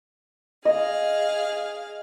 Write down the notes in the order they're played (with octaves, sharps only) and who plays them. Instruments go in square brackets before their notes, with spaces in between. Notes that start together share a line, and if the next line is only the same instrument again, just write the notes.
[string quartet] G#4 F5 [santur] D#5